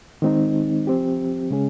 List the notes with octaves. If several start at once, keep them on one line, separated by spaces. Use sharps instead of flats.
D#3 G#3 C4 D#4
F3 C4 G4
C#3 G#3 C#4 G#4